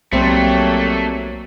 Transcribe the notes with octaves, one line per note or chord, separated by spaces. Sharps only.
B1 F#3 G3 A3 A#3 C4